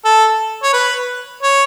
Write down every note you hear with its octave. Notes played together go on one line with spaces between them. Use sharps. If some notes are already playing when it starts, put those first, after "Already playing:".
A4
C#5
B4
C#5